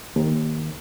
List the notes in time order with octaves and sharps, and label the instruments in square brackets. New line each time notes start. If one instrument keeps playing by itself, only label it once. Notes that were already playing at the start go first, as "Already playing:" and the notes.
[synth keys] D#2